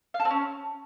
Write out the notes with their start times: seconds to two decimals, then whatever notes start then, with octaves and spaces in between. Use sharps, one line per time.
0.14 F5
0.20 A4
0.25 C4
0.30 C#4